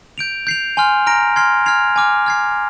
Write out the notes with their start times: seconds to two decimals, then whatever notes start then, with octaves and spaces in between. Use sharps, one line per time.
0.18 G6 D7 F7
0.47 G6 C7 F7
0.77 G#5 C6 F6
1.06 A#5 F6 A#6 D7
1.36 C6 F6 G#6 C7
1.66 F6 G#6 C7 F7
1.96 G#5 D6 F6
2.26 F6 G#6 C7